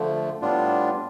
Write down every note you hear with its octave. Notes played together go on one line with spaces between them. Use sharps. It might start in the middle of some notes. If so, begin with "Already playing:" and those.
Already playing: D3 F3 A3
A2 G3 B3 D4 F4